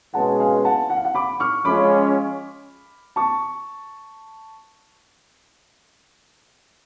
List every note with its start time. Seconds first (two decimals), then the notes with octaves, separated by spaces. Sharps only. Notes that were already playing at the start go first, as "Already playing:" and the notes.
0.14 B2 G#3 C#4 G#4 B4 F#5 A5
0.40 F5 G#5
0.65 F#5 A5
0.90 F#5
0.96 F5
1.05 F#5
1.15 B5 D6
1.40 C#6 F6
1.65 F3 G#3 C#4 F4 B5 D6
3.16 A5 C#6